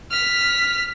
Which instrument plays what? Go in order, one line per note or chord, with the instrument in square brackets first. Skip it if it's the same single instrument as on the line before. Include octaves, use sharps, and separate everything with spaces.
[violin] F6 B6